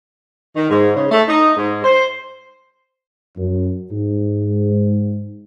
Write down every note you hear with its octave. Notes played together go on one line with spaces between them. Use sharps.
D#3
G#2
C#3
A3
D#4
G#2
C5
F#2
G#2